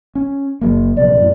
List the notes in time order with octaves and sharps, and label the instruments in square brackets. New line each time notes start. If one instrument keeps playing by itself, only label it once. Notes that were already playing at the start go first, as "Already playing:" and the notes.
[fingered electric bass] C#4
F#1 F#3 A#3
[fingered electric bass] A#1 C3 B3 [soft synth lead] D5
[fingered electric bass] F#2 A2